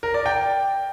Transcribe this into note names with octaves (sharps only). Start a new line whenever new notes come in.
A#4
D5
G5